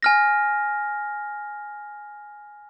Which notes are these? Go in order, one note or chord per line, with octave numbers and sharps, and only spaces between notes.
G#5 F6 A#6